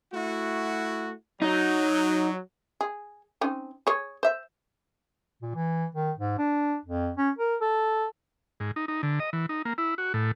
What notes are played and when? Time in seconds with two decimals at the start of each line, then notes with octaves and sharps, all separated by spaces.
0.13 A3 E4 F#4
1.42 F#3 D#4
2.81 G#4
3.41 C4 C#4 D#4
3.87 G#4 C#5
4.23 C5 E5
5.42 A#2
5.55 E3
5.95 D#3
6.18 G#2
6.38 D4
6.85 F2
7.17 C#4
7.39 A#4
7.61 A4
8.60 G#2
8.76 D#4
8.88 D#4
9.03 D3
9.20 D#5
9.33 E3
9.49 D#4
9.65 A#3
9.78 E4
9.98 F#4
10.14 A2